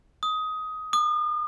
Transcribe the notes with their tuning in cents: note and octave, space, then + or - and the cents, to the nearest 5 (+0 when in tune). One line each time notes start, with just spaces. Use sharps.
D#6 +15
D#6 -40